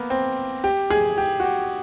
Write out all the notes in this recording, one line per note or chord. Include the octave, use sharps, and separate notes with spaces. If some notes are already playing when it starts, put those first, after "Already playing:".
Already playing: A#3 B3
C4
G4
G#4
G4
F#4
G4